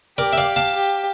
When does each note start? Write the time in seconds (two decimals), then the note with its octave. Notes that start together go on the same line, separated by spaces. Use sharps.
0.18 G4 A#4 D5
0.33 E5
0.38 D5 F5
0.56 F5 A5
0.75 G4